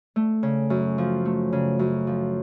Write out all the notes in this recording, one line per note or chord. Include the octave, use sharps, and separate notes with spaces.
A3
C#3
F#2
F3
A3
C#3
F#2
F3